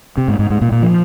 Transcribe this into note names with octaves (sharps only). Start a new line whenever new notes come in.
C3
G#2
G#2
G#2
A#2
A#2
F3